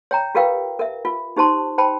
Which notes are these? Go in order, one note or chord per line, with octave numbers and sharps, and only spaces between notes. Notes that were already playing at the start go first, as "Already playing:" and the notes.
C#5 G5 A#5
F4 G4 A#4 B4 F5 G5
A#4 E5
F4
D#4 G4 C5 A5 C6
C5 G5 A5 B5